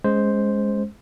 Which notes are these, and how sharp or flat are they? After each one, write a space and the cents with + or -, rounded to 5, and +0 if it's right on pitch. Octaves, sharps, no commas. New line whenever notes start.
G#3 +5 C#4 +0 C5 +0